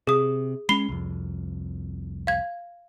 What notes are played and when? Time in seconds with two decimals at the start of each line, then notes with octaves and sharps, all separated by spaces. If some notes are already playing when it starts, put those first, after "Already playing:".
0.07 C3 G#4 D#6
0.69 G#3 C#4 B5 C7 G7
0.88 C2 F2
2.27 F5 G#6